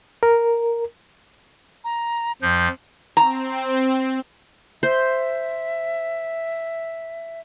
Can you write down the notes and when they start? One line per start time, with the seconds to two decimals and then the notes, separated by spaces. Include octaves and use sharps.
0.23 A#4
1.84 A#5
2.42 F2 F3 G6
3.17 C4 A#5
4.83 C5 E5